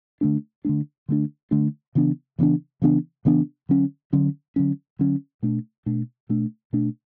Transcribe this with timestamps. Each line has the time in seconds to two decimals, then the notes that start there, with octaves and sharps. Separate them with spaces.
0.21 D3 A3 D4
0.65 D3 A3 D4
1.09 D3 A3 D4
1.51 D3 A3 D4
1.95 C#3 E3 B3 D4
2.39 C#3 E3 B3 D4
2.82 C#3 E3 B3 D4
3.25 C#3 E3 B3 D4
3.69 D3 F#3 C#4
4.13 D3 F#3 C#4
4.56 D3 F#3 C#4
4.99 D3 F#3 C#4
5.43 B2 A3 D4
5.86 B2 A3 D4
6.29 B2 A3 D4
6.73 B2 A3 D4